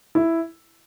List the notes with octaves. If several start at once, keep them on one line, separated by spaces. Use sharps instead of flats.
E4